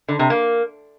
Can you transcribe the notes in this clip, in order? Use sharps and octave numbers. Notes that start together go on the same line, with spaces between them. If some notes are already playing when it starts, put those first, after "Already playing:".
D3
C3
A#3